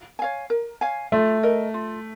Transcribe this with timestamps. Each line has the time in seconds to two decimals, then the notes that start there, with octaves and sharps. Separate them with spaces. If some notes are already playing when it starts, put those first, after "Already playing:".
0.19 C#5 F5 G#5
0.50 A#4
0.81 C#5 F5 G#5
1.12 A3 F4
1.43 A#4 D#5
1.74 F4